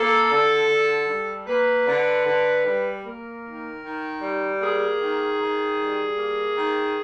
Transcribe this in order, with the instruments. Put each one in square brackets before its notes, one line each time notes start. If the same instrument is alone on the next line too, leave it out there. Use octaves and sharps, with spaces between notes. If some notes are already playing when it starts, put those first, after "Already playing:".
Already playing: [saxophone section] A#3 A4
D3
D3
G3
A#3 B4
D3
D3
G3
A#3 A#4
D#3
D#3
G3
A#3 G#4
D#3
D#3
G3
A#3
D#3